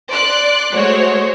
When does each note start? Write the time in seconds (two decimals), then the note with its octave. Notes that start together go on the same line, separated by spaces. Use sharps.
0.11 D5 C6 F#6
0.73 G#3 A3 F#4 C5 C#5